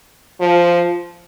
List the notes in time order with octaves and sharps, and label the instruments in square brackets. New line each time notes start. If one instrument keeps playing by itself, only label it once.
[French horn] F3